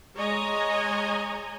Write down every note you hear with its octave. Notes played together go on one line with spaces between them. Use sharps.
G#3 C#5 D#5 G#5 A#5